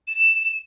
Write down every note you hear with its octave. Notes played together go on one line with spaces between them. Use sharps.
E7